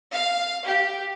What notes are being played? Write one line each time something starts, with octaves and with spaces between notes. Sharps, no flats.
F5
G4